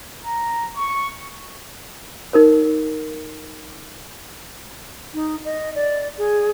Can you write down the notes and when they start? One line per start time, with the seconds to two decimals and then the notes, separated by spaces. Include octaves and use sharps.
0.25 A#5
0.77 C#6
2.33 D#4 A#4 C#5
5.14 D#4
5.45 D#5
5.75 D5
6.18 G#4